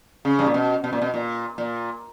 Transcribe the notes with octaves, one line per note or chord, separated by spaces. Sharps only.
C#3
G2
A#2
B2
B2
A#2
B2
A#2
A#2